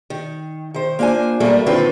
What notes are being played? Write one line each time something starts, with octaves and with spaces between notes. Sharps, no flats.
D#3
D#3 C5
A#3 D4 F4 C5 G#5
E2 G2 B2 G3 A3 A#3
D#2 D3 D#3 C4 F4 B4